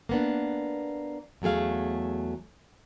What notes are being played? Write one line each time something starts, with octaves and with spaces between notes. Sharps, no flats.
A#3 B3 D4
E2 F#3 A3 G#4 F5